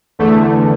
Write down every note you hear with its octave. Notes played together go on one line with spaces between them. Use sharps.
E2 D3 A3